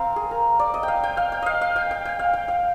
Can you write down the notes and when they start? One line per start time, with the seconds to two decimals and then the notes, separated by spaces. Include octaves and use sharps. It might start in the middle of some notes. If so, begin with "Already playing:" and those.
Already playing: C4 A#4 F5
0.16 G#4
0.31 A#4
0.59 D5
0.74 D#5
0.83 G5
0.88 F5
1.03 G5
1.17 F5
1.32 G5
1.42 D#5 F5
1.61 F5
1.76 G5
1.91 G5
2.05 G5
2.19 F5
2.33 G5
2.48 F5